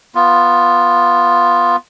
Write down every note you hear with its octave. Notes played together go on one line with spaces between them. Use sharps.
B3 F4